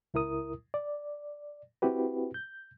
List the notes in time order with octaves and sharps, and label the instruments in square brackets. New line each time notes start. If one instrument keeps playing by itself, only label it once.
[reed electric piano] C#2 E4 A#4 D#6
D5
C4 E4 F#4 G4 B4
G6